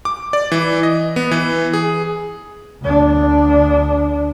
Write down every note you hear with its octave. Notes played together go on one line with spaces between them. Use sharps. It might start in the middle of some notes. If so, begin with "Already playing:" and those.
D6
D5
E3
D#5
B3
E3
G#4
D2 D4